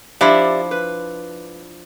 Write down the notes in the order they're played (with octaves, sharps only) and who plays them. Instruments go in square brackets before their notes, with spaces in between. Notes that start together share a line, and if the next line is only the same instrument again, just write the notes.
[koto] F3 D4 E4 [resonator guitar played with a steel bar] G4 D5 E5
[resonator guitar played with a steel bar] B4